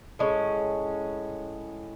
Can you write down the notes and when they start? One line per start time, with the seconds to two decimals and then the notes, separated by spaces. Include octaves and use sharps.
0.19 A2 G#3 C#4